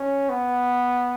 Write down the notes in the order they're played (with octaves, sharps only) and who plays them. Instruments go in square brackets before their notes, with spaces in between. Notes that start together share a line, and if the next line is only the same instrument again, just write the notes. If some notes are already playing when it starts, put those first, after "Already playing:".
Already playing: [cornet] C#4
B3